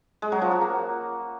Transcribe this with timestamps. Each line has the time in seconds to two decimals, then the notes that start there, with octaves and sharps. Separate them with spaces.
0.22 G#3
0.32 F#3
0.42 F3
0.51 F#4
0.61 A#3